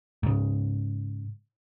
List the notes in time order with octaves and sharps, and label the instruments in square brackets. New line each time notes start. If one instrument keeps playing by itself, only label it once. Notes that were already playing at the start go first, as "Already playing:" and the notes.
[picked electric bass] G#2 C#3